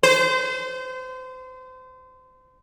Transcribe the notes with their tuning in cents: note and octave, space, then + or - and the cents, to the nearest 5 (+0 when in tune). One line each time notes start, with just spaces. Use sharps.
C5 -30